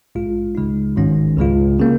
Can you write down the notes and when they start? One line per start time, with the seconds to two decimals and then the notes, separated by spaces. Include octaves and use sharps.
0.15 A#1 G#2 G#3 F4
0.55 C#2 C#3 G#3 D#4
0.96 G#1 G#2 D#3 C#4
1.37 C#2 C#3 G#3 F4
1.80 C#3 A#3